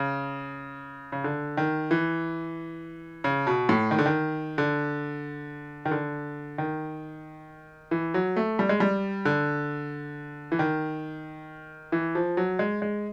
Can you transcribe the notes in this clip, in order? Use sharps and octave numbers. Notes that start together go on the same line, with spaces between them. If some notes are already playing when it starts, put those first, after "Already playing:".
Already playing: C#3
C#3
D3
D#3
E3
C#3
B2
A2
D#3
D3
D#3
D3
D#3
D3
D#3
E3
F#3
A3
G3
G#3
G3
D3
E3
D#3
E3
F3
F#3
G#3
G#3